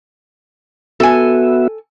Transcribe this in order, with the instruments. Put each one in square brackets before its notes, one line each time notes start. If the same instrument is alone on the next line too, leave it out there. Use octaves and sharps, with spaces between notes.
[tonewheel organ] B3 F#4 E5 [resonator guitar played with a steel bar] A4 G#5